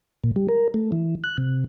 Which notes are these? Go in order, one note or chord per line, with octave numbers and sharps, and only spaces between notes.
A#2
G3
A#4
A3
E3
F#6
C3